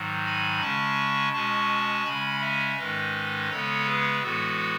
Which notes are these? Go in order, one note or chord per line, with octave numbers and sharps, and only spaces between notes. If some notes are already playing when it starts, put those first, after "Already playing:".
Already playing: G#2 D#3 F#3
G#5 B5
C#3 G#3 C#4 A5 C#6
B2 G#3 C#4 A5 C#6
C#3 G#3 C#4 G#5 B5
E5 G#5
G#2 D#3 G#3 C#4 B4 D#5
C#3 G#3 B3 A4 C#5
G#4 B4
A2 E3 G#3 B3 F#4 A4